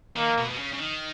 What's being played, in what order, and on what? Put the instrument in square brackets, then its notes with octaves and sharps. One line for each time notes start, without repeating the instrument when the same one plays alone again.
[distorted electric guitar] D#3 [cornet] A#3
[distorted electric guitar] B2
B2
C#3
C#3
D#3